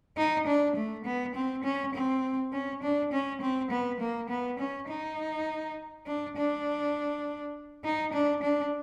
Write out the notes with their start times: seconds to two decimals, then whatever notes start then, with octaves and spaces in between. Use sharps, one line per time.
0.17 D#4
0.47 D4
0.76 A3
1.05 B3
1.35 C4
1.64 C#4
1.94 C4
2.52 C#4
2.82 D4
3.12 C#4
3.41 C4
3.71 B3
3.99 A#3
4.29 B3
4.59 C#4
4.88 D#4
6.06 D4
6.36 D4
7.84 D#4
8.13 D4
8.42 D4